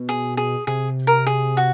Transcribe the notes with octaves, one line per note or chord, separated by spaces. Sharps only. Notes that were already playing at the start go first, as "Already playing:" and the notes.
Already playing: B2
G#4
G#4
C3 G#4
A#4
G#4
F#4